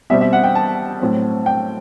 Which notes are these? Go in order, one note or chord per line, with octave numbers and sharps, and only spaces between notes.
B2 G3 C4 E5
E5
F#5
G5
A5
A2 F#3 C4
G5